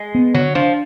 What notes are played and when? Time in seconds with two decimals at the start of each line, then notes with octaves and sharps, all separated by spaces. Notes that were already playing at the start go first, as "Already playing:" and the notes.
Already playing: G#3
0.15 B3
0.34 D3 F#3
0.55 F3 D4